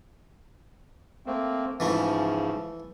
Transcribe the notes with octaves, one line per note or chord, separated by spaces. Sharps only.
A3 A#3 C4
G#2 C#3 E3 F3 A3 E4